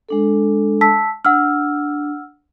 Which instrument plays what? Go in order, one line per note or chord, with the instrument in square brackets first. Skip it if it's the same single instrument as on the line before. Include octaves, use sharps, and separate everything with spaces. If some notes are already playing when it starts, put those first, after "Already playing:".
[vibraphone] G#3 D4 A4
[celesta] A5 E6 B6
[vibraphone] D4 [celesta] F#5 E6 F6